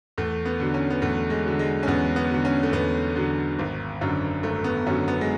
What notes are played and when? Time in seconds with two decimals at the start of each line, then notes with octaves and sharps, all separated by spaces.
0.18 E2 A3
0.45 B3
0.60 D3 F#3
0.74 C#4
0.90 B3
1.02 E2 A3
1.30 G#3
1.45 D3 F#3
1.59 G#3
1.83 C#4
1.87 E2 B3
2.16 B3
2.31 D3 F#3
2.45 C#4
2.63 A3
2.72 E2 B3
3.16 D3 F#3
3.59 G#1
4.01 F#2 D3 F#3
4.43 G#1 A3
4.64 B3
4.87 F#2 D3 F#3 C#4
5.08 B3
5.21 G#3